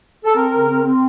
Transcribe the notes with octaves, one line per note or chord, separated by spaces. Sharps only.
A4
C4 A#4
C#3
C4
C4